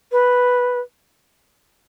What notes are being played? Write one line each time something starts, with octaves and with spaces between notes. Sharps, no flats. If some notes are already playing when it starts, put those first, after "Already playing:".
B4